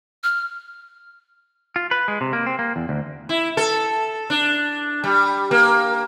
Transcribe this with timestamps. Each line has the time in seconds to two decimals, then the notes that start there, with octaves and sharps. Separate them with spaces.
0.24 F6
1.76 F4
1.91 B4
2.08 G#3
2.21 C3
2.33 A#3
2.46 C4
2.59 A#3
2.76 E2
2.89 D2
3.29 E4
3.57 A4
4.30 D4
5.04 G3
5.51 A#3